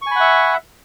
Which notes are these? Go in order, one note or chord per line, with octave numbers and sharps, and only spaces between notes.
E5 F#5 G#5 B5 C#6